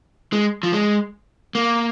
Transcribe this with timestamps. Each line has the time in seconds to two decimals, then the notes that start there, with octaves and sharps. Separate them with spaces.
0.33 G#3
0.63 F3
0.73 G#3
1.55 A#3